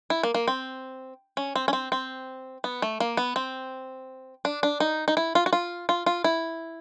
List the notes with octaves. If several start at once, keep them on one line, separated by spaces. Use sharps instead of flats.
E4
A#3
A#3
C4
C#4
C4
C#4
C4
C4
B3
A3
A#3
B3
C4
D4
D4
D#4
D#4
E4
F4
F#4
F4
F4
F4
E4